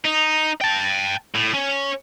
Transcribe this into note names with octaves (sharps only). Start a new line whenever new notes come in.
D#4
G5 A5
A2
C#4